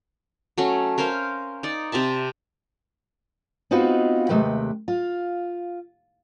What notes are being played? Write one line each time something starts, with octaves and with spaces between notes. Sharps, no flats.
F#3 A3 C#4
C#4 A#4 C5 F5
D#4 D5
C3 C4 E5 A5
B3 C4 D#4 F4 F#4 B4
D#2 C3 G#3 A3 B4 G5
F4